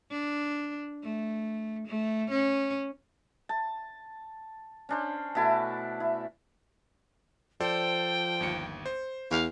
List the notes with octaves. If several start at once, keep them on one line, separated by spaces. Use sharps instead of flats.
D4
A3
A3
C#4
A5
C#4 D4 C5
B2 A3 E4 A5
E4
F3 A4 C5 D5 G5
G1 D#2 C#7
C5
E2 F5